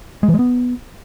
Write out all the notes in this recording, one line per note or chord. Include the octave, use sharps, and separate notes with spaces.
G#3
E3
G#3
B3